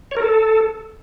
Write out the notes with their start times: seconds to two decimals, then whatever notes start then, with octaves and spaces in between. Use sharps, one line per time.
0.11 C#5
0.17 A#4
0.22 A4